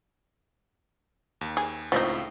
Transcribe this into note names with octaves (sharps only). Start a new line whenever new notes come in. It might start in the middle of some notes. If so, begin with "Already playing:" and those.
D#2
G#4
C#2 A2 F3 C4 D#4